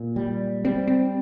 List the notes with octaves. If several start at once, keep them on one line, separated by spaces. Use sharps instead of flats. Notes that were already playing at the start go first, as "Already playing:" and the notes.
Already playing: A#2
G3
G3 C4
C4